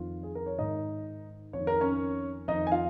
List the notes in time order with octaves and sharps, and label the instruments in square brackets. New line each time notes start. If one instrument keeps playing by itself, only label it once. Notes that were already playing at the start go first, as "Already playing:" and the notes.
Already playing: [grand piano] F2 D#3 F4
G#4
A#4
C#5
G#2 D#3 D#4 D#5
F2 D#3 C#5
A#4
C#4 C#5
F2 D#3 D#4 D#5
G#5
F4 F5